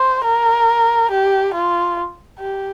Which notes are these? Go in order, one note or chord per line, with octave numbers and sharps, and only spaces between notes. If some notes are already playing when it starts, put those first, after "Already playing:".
Already playing: C5
A#4
G4
F4
G4